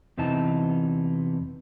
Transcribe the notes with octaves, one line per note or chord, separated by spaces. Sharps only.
E2 C3 E3 D#4 A5